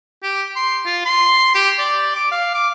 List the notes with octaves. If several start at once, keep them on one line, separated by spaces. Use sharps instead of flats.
G4
C6
F4
C6
G4
D5
D6
F5
D6